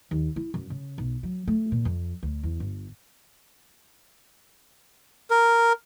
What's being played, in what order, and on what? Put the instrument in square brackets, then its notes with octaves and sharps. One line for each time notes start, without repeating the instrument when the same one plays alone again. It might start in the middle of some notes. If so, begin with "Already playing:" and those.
[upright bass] D#2
E4
F#2
C#3
B1
F#3
A3
A#2
F2
D2
E2
G1
[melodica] A#4